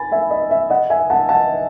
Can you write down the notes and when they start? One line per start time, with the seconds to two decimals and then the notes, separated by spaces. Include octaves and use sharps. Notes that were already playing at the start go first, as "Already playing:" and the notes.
Already playing: G#5 B5 A6
0.12 E5 G#5
0.31 D#5
0.51 E5
0.70 D#5 F#5
0.90 E5 G#5
1.10 F#5 A5
1.29 F#5 A5